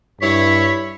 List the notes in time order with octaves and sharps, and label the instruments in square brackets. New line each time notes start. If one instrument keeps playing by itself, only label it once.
[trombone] G2 [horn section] E4 C#5 [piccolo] B6